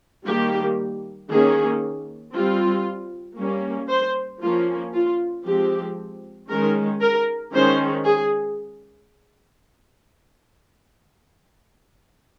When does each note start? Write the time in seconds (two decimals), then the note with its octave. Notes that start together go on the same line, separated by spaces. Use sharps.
0.26 D#3 G3 A#3 G4
1.30 D#3 A#3 C#4 G#4
2.33 G3 C4 F4
3.38 G3 A#3 C#4
3.89 C5
4.41 F3 A#3 C#4 F4
4.94 F4
5.46 F3 G#3 C4 G4
6.50 D#3 G#3 C#4 A#4
7.01 A#4
7.53 D#3 G#3 C#4 C5
8.05 G#4